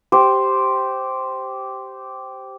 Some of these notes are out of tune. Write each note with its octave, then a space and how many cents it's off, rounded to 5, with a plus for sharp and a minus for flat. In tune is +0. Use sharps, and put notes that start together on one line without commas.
G4 -10 C5 +0